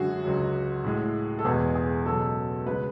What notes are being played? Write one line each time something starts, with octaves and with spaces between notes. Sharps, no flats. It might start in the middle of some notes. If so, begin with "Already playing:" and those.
Already playing: F#2 D3 G#3 F#4 G#4
C#2 C#3 F#3
A2 G#3
A4
E2 B2 G#3 G#4
G#4
C#2 B2 F#3 A4
C#3 G#3 B4